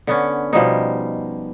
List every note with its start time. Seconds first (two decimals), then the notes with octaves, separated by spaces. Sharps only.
0.07 D3 B3 C#4
0.53 B2 F3 G3 D#4